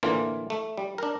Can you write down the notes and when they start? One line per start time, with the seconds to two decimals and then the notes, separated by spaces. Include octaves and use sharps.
0.03 A2 D3 E3 A#3 F4
0.50 A3
0.77 G3
0.98 D4 A#4